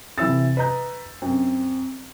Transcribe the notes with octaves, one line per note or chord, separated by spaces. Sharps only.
C3 E3 E4 E6 A6
B4 D#5 A#5 G6
F#2 C4